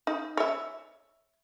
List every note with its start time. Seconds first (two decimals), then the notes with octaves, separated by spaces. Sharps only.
0.07 D#4
0.37 C#5 E5